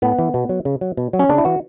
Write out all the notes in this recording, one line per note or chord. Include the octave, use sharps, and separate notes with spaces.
A2 B3
E3
B2
F#3
C#3
F#3
B2
F#3
C#4
C#3 D4
E4
E3 F#4